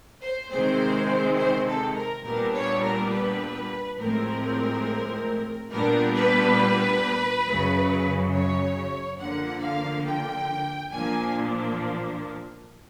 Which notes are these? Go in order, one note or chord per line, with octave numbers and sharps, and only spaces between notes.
C5
C3 D#3 G#3 C4 C5
C5
A4
A#4
A#2 G3 B3 D4 A#4
C#5
A#4
B4
A2 F3 G#3 C4 A#4
A#2 G3 B3 D4 A#4
B4
F#2 C#3 F#3
C#5
D3 F3 A#3 F#5
F5
G5
A#2 F3 A#3 D4 G#5